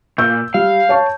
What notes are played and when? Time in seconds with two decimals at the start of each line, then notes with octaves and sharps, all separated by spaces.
0.18 A#2 E6 G6
0.54 G3 F5
0.89 C#5 A5 C#6